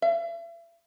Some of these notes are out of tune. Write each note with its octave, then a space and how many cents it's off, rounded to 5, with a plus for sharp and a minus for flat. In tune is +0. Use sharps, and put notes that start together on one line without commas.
E5 +40